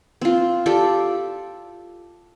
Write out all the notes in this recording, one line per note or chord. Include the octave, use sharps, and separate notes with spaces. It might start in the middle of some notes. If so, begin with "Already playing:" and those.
C4 F4
F4 G4 A4 D5